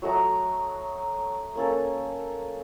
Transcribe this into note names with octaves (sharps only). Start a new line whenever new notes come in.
F#3 A3 A#5 D#6
A#3 C#4 A4